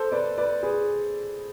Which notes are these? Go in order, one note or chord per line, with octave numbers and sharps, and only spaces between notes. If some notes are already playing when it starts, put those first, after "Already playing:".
Already playing: A4 C5
B4 D5
B4 D5
G#4 B4